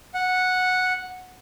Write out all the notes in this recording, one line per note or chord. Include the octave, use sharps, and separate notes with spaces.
F#5